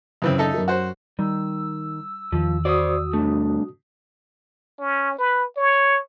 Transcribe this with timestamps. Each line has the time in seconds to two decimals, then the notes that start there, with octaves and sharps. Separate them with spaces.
0.22 C#2 F#2 C#3 E3 C4
0.38 D#4 A4 E5
0.54 F#2 A#4
0.68 F#4 C5
1.19 D#3 G3 E6
2.32 E2 D#3 F3
2.65 F#4 C5 D5 D#6
3.13 C2 A3 D4
4.80 C#4
5.18 B4
5.57 C#5